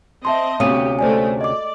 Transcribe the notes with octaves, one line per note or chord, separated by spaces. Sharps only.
C4 D#5 E5 A5 C6
D2 C3 B3 C#4 G4 F5 D#6 D#7
G#3 A3 C5 D5 G#5
D5 D#5 D6